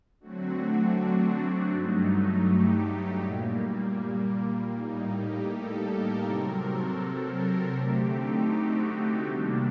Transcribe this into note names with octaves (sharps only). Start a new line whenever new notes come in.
D3 F#3 A3 C4 F#4
D4
D4
G2 F#3 A3 D#4
G4
A#2 G3 A#3
A2 G3 A#3 D#4
G4
A4
A#4
C3 F#3 C4 A#4
A4
A#4
A#4
D3 A3 C4 G4
D#4
F#4
D#4
C3 D#3 G3 A#3 D4